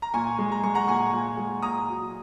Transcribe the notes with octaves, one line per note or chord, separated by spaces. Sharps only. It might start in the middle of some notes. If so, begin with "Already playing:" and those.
A#5
A#2 G#5 C#6
G#3
A#5
G#3 C#6
F#5 A#5
A#2 G#5 C#6
A#2
G#3
A#2 A#5 D#6
F#3